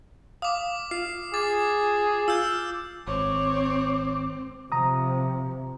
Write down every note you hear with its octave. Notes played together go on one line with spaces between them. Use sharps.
F5 D6 D#6
F4 C7
G#4 D6 A6
F4 E6 F6 G6
G#1 C4 C#5 D6
C3 F3 A#5 D#6